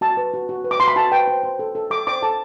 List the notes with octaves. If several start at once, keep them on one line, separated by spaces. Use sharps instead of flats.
F#4 A5
B4
F#4
F#4
B4
D6
F#4 C6
B5
F#4 A5
B4 G5
C5
C5
A4
A4
A4 D6
C5 D6
A4 A5